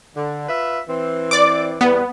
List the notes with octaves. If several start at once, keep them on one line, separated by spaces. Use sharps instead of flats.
D3
F4 B4 E5
E3 C4
D5 D6
E2 G3 B3